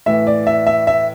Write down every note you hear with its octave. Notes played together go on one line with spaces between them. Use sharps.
A2 E3 E5
D5
E5
E5
E5